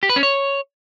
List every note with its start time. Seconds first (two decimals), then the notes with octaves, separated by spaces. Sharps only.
0.03 G4
0.09 B4
0.16 C#4
0.23 C#5